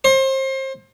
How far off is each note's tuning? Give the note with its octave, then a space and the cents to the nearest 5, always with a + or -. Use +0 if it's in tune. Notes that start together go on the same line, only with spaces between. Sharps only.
C5 +30